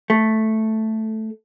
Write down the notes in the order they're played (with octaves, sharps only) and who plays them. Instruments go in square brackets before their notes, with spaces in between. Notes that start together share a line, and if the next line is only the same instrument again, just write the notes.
[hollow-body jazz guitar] A3